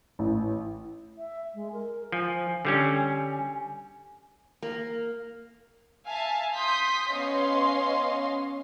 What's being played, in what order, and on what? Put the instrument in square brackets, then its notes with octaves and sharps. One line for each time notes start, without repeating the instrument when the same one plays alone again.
[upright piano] A1
[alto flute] E5
G#3
A#4
[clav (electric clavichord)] F3 [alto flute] G#5
[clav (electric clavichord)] D3 G3 C#4
[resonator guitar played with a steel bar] A#3
[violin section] E5 F5 G#5 A5
C6 D#6 G6 B6
B3 C#4 C#5 D#5 F5 C6